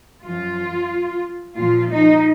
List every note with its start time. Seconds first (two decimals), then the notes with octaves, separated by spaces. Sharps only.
0.24 F#2 F3 F4
1.56 A#2 F3 F4
1.90 D#4